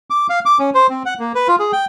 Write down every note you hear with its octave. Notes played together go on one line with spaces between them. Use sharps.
D6
F5
D6
C#4
C5
C4
F#5
A#3
B4
F4
G#4
G5